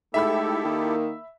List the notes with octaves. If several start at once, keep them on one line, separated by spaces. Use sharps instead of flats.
G#2 A3 E4 G4 A4 E5 B5 E6
D#3 A#3